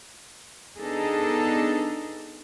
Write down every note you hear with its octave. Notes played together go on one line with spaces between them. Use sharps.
B3 D4 D#4 G#4 A4